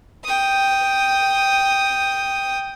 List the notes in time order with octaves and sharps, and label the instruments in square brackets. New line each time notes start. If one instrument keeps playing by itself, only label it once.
[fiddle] G5 D#6